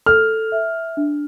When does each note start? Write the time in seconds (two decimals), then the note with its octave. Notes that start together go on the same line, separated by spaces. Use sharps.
0.06 A4 F6
0.52 E5
0.97 D4